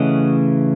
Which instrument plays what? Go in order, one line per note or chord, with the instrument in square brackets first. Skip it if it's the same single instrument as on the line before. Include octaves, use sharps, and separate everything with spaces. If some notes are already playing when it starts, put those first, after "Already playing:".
Already playing: [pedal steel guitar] C#3 E3 A3 C#4 D#5 F#5